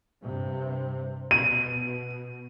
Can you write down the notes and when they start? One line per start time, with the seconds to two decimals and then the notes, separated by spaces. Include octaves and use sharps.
0.23 G2 C3
1.31 B2 D#7